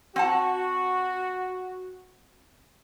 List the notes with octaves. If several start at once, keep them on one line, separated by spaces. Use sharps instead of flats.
C4 F#4 F#5 A5